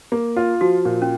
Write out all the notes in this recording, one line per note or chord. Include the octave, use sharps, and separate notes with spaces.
A#3
F4
F3 F#4
A#2
C#4